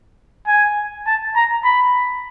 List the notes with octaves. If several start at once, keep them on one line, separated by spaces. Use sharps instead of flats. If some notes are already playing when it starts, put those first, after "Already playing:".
G#5
A5
A#5
B5